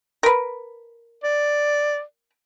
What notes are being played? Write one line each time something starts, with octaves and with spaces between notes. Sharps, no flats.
A#4 B4
D5